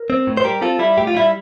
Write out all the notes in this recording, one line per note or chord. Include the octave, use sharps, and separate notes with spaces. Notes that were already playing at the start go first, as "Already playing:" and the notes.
Already playing: A#4
C4
A2
C5
G3 G4 A#4
C4 F4 A4
G3 E4
A2 G4
F4
G3 E4